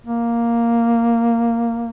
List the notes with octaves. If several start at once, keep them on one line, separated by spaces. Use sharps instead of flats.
A#3